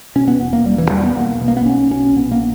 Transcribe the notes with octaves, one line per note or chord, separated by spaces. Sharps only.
B2 C#4
B3
E1
A#3
E1 G3
E3
E2 G3
B3
B1 A#3
B2
A#3
B3
B1 C#4
B2 C#4
A#1 B3
A#3